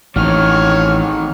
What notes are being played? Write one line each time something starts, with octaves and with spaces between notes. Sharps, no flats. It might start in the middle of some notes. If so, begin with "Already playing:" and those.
A1 D#3 C4 C#5 F6